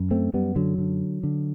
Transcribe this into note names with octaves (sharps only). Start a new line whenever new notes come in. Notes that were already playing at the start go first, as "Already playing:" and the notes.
Already playing: F#2
A3 C4
F#2 G3 B3
D3 F#3
D3
D3